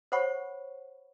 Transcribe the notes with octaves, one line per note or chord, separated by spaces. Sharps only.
C5 C#5 F#5 B5 C#6